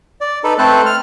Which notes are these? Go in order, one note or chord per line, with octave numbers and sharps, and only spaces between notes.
D5
D#4 A4 B4
A3 C4 A4 B4 C5 F#6
F6